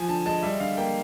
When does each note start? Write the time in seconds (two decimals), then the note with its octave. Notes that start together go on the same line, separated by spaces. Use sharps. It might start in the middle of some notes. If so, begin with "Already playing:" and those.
Already playing: F3 G#5
0.08 D3 A5
0.26 G#3 A5
0.42 G3 E5
0.60 D3 F5
0.77 A#3 G5